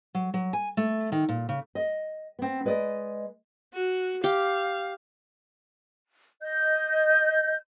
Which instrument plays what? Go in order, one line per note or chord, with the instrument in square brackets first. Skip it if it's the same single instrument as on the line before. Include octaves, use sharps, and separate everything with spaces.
[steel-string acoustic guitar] F#3
F#3
G#5
A3
D#3
A#2
C#3
[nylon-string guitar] D#5
B3 C4
G#3 B4 D5 D#5
[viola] F#4
[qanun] G4 [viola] F5
[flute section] D#5 G6